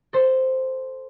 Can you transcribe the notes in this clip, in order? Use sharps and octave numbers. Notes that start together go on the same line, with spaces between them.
A4 C5